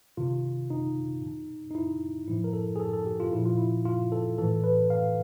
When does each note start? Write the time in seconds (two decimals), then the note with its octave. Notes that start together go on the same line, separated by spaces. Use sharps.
0.17 C3 D#3 F4
0.70 D#4
1.22 B2
1.70 D#4
1.75 E4
2.28 A2 F3 E4
2.44 A#4
2.53 A4
2.76 G#4
2.80 A4
2.93 A4
3.06 G4
3.20 F4
3.33 A#2 F3 E4
3.45 F4
3.58 E4
3.85 F4
4.12 A4
4.38 A2 E3 A4
4.64 B4
4.90 F5